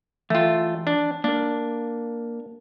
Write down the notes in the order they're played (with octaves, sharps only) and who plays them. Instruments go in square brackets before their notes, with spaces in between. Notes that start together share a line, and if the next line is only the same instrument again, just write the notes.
[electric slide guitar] E3 G5 [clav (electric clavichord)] A3 F4
[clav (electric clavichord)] D4
[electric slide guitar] A#3 A#4 [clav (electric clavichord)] D4